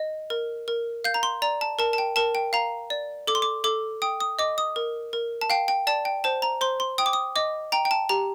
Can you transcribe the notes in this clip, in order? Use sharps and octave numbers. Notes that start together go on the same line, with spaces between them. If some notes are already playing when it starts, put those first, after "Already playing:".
Already playing: D#5
A#4
A#4
F5 G6
A#5
C6
D5 A#5
A5
A#4 A5
A5
G5
A#4 A5
G5
F5 A#5
D5
A4 D6
C6
D6
A4 D6
G5 D#6
D#6
D#5 D6
D#6
A#4
A#4
A5
F5 G5
G5
D5 A5
G5
C5 A5
A#5
C5 C6
C6
G5 D#6
D6
D#6
D#5 D6
G5 A#5
G5
A5
G4 A#5